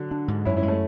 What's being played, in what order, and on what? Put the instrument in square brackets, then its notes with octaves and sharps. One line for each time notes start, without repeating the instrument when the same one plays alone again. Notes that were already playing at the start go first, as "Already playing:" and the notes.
Already playing: [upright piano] D3 F#3
[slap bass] D4
G#2
[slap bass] F#2 [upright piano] C#4 E4
[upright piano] C#4 E4
[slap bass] G#3
[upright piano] A3 C#4